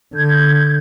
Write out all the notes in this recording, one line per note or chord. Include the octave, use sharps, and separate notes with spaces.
D3 G6 G#6